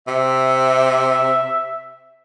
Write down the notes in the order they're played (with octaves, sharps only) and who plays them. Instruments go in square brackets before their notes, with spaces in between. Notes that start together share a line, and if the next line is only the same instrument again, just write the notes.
[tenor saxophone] C3 [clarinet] E5